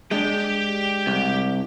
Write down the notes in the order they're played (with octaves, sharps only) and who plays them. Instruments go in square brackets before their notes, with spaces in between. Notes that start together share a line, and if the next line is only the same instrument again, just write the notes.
[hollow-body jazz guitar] G#3 D4 [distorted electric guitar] G4 G5
[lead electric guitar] C2